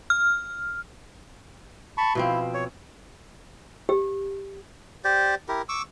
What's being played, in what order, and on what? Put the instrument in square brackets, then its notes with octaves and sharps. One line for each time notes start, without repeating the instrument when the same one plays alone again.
[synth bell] F6
[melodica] A5 B5 C#6
[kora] B2 F3 C4 [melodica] E4
[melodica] C#5
[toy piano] G4
[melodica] G4 C5 D5
E4 G4 A#4
C#6 D6 E6